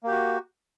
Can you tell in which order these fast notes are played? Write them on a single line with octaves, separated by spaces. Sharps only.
A#3 G4 F#4